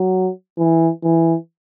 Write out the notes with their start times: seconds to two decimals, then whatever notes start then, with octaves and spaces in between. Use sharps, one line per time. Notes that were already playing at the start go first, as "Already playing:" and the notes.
Already playing: F#3
0.58 E3
1.04 E3